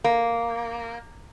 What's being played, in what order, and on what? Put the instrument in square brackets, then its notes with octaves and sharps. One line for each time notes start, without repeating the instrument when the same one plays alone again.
[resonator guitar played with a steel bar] A#3